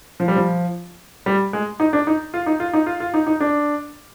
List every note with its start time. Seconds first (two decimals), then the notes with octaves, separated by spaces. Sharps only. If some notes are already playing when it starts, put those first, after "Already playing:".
0.20 F3
0.28 G3
0.36 F3
1.26 G3
1.53 G#3
1.80 D#4
1.93 D4
2.07 D#4
2.34 F4
2.46 D#4
2.60 F4
2.73 D#4
2.86 F4
3.00 F4
3.14 D#4
3.27 D#4
3.40 D4